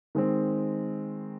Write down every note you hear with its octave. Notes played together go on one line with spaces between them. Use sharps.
D#3 G#3 C4